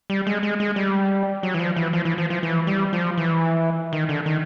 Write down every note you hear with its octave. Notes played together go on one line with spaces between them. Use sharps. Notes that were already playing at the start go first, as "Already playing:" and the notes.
G3
G#3
G#3
G#3
G3
F#3
E3
F3
E3
F3
E3
F3
F3
E3
G3
F3
E3
D#3
D3
D#3